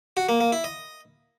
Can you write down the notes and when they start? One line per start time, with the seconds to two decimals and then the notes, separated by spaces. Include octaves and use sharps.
0.17 F#4
0.29 A#3
0.41 A#3
0.52 E4
0.64 D#5